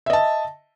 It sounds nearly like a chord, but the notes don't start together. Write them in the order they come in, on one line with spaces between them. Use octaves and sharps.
E5 D#5 A5